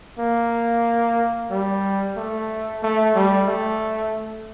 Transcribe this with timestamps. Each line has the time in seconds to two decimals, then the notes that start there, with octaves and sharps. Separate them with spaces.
0.19 A#3
1.51 G3
2.17 A3
2.82 A3
3.15 G3
3.48 A3